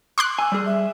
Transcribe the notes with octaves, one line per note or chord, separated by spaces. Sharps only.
C6 D6 F#6
G#5 E6
G3 G#4
E5